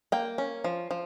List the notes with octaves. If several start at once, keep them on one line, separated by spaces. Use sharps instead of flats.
A#3 G5
C#4
F3
F3